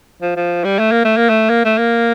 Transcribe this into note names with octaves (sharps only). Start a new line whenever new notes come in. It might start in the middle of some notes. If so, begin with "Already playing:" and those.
F3
F3
G3
A3
A#3
A3
A#3
A3
A#3
A3
A#3